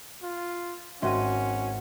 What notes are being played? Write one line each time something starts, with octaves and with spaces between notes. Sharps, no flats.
F4
G#1 C#4 F#4 E5 C6 D#7